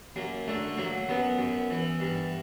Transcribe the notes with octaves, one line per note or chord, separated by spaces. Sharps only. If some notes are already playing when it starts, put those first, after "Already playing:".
F#2 A#3
D3 A3
F#3 A#3
F#2 B3
F#2
E3
G2